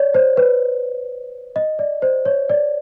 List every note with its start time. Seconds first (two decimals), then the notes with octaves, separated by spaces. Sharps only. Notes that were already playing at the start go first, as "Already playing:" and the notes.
Already playing: C#5 D5
0.14 C5
0.37 B4
1.56 D#5
1.79 D5
2.02 C5
2.25 C#5
2.50 D5